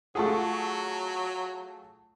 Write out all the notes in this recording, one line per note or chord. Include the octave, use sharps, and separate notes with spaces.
F#3 A3 F4 G#4 F#5 A5 C#6